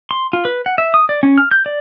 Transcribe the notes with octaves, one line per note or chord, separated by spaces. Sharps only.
C6
F4
B4
F#5
E5
D#6
D5
C#4
F6
G6
D5